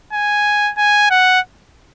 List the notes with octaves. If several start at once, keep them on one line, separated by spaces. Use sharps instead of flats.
G#5
G#5
F#5